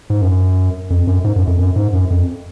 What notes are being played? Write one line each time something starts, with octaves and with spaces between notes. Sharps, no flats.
G#2
F#2
F2
F#2
G#2
F#2
F2
F#2
G#2
F#2
F2